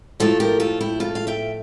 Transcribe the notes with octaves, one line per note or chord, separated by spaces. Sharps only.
A2 F3 A3 F4 A4
G4 A#4
F4 A4
E4 G4
F4 A4
F5
E5 G5